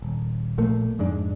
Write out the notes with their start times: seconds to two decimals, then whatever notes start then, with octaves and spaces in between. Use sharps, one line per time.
0.02 D#1
0.58 A#1 A#2 A3 A#3
0.99 F2 G#2 G#3 D4